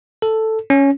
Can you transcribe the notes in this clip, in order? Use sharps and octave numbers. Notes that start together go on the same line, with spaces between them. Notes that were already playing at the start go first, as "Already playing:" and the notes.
A4
C#4